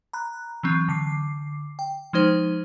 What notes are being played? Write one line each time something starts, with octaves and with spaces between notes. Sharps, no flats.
A#5 B5 F#6
E3 F#3 C4
D3 D6 C7
G5
F3 G#3 D#4 C5